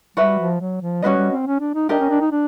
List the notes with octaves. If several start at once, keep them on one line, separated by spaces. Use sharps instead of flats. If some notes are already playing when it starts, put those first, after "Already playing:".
G3 F#4 B4 E5
F3
F#3
F3
G3 C#4 F#4 B4 D#5
G3
C4
C#4
D4
D#4
D4 G4 A#4 D#5
C#4
D4
D#4
D4